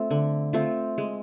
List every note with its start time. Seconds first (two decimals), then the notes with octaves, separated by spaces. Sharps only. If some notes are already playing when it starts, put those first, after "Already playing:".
Already playing: A3 C4 F4
0.10 D3
0.53 A3 C4 F4
0.98 G#3